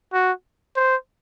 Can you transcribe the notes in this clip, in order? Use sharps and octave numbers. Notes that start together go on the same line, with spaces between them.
F#4
C5